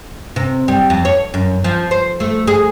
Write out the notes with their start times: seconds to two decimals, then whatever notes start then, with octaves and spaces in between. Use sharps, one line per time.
0.36 C3
0.68 G3
0.90 F2
1.05 C#5
1.34 F#2
1.64 F3
1.91 C5
2.20 A3
2.47 G#4